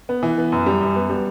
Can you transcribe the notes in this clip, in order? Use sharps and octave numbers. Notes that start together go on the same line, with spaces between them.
B3
E3
B3
F#2
G3
F#2
B3
G3